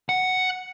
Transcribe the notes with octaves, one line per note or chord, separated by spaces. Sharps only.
F#5